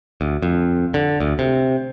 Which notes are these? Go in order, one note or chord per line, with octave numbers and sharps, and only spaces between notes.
D2
F2
D3
D2
C3